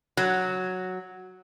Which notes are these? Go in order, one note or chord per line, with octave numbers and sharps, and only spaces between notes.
F#3